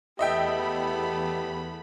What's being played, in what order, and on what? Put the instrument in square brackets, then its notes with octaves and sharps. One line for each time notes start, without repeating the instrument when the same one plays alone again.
[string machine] E2 B5 [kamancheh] A3 B3 [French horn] G4 [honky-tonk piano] D#5 E5 G5